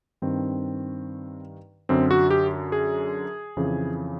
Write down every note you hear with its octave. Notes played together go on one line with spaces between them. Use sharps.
G2 D#3 C4
F#2 D3 C4
F#4
G4
G#4
F2 C#3 E3